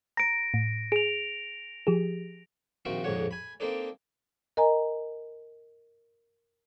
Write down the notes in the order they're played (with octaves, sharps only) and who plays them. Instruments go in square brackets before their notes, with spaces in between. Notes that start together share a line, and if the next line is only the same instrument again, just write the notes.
[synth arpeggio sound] A#5 [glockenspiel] A#6 D7
[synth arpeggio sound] A2
[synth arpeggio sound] G#4 [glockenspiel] D7 F7
[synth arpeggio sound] F3 G4 G#4
[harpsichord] A#1 D#3 C4 F#4 E5 F5
A#1 F2 G#2 D3 C#5 F#5
G#5 B5
A#3 C4 D4 D#4 A4 D5
[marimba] A#4 D#5 G#5 A#5